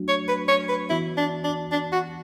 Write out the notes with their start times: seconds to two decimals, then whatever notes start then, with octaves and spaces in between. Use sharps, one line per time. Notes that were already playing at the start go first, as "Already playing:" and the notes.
Already playing: F#3 A3 D4 F#4
0.08 C#5
0.28 B4
0.48 C#5
0.69 B4
0.90 E3 B3 E4 F#4
1.17 D4
1.44 D4
1.72 D4
1.92 F#4